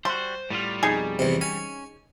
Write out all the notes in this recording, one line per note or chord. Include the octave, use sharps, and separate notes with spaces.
G3 F#4 C5 C6
A2 G3 B3 F4
F2 B2 D#4 G#4
E2 C3
C#4 G#5